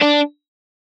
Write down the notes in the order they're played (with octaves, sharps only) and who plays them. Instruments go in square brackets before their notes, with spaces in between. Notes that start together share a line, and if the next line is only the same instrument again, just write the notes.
[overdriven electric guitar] D4